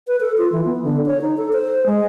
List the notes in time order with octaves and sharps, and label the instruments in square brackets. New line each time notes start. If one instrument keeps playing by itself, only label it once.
[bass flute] B4
A4
F4
E3
B3
D3
C#5
D#4
A4
C5
G#3